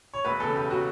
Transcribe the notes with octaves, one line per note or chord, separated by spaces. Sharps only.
C#5
E1 B4
E2 C#3 A4
E1 G4
C#3 F#4